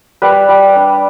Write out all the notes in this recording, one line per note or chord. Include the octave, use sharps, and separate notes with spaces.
G3 B4
G3
D4